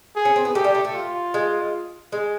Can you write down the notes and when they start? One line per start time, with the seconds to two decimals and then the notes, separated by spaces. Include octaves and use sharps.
0.16 G#4
0.25 C#4
0.36 C4
0.45 B3
0.55 A3 G4
0.64 G3
0.75 A3
0.85 A3
0.95 F4
1.34 G#3
2.12 G#3